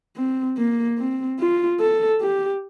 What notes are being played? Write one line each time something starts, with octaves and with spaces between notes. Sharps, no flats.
C4
A#3
C4
F4
A4
G4